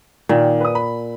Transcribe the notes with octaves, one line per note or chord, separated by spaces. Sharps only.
A#2 D#3 G5
B4 D#6
B5